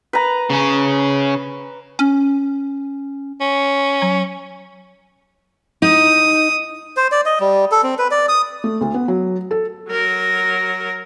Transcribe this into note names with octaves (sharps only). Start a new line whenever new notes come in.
B4 A#5
C#3 C#4
C#4
C#4
F#3
D#4 D#6
C5
D5
D#5
G3
A4
C4
B4
D5
D#6
A3
D2
B3
F#3
A4
F#3 A#4